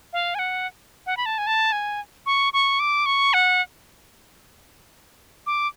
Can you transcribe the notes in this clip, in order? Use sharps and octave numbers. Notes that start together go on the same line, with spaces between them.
F5
G#5
F#5
F#5
B5
A5
G#5
A5
G#5
C#6
C#6
D6
C#6
F#5
D6